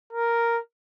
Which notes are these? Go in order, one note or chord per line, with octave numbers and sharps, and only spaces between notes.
A#4